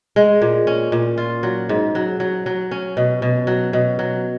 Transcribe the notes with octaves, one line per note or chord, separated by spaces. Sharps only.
G#3
A#2
C#4
A#2
F4
F#3
G#2
F#3
F#3
F#3
C#4
B2
B2
F#3
B2
F#3